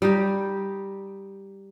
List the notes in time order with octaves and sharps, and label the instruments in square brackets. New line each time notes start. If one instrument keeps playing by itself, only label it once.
[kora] G3 D#4 G4